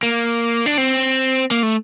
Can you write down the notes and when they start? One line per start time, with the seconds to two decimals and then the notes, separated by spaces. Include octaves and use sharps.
0.03 A#3
0.66 D4
0.78 C4
1.51 A#3
1.63 A3